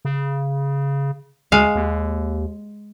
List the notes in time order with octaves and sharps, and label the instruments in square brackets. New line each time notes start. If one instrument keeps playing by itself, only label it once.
[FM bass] C#3
[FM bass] D2 [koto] G#3 F5
[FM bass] D#2